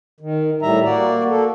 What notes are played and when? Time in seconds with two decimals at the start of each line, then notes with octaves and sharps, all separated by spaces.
0.21 D#3
0.62 A2 G3 E5 A#5
0.85 A#3 F#4 D5
1.30 A#3 A4